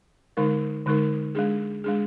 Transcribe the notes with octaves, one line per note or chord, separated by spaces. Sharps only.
D3 G#3 D#4 A#4
D3 G#3 D#4 A#4
G#3 D4 G#4
G#3 D4 G#4